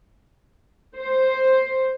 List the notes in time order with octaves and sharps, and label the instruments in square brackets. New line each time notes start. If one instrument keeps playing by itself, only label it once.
[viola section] C5